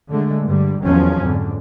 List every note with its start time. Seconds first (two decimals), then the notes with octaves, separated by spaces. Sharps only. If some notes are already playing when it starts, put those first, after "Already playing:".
0.10 D3 G#3 A3
0.45 G2 D3 G3
0.82 E2 D#3 F3 F#3 C#4
1.23 F2 G#2 D3